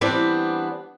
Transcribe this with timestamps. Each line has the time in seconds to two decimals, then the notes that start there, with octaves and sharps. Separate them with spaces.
0.01 E3 G3 B3 C4 D4